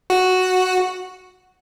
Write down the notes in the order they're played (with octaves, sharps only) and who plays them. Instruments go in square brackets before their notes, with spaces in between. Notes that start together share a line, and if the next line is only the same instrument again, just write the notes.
[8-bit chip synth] F#4